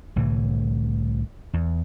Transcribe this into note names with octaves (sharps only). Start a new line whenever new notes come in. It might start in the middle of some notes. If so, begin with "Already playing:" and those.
C2 A2 D3 E3
E2